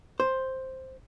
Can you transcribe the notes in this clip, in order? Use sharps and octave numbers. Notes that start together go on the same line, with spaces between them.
C5